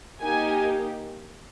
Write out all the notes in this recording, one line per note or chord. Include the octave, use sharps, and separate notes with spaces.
A#3 D#4 G4 G#5